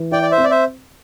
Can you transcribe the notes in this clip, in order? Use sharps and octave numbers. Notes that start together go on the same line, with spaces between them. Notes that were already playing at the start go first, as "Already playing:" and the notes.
Already playing: E3
E4 D5 G5
D5
C5 E5
C4
D5
C5 E5